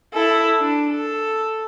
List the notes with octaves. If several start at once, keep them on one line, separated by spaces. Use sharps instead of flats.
E4 A4
D4
A4